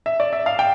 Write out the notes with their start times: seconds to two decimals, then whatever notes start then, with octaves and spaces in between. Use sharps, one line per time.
0.06 E5
0.20 D5
0.33 E5
0.46 F5
0.59 G5